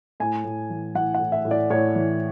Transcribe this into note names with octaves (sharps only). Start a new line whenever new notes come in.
A2 G#5
A2
E3
E3 F#5
F#5
A2
E5
A2
D5
A2 C#5
E3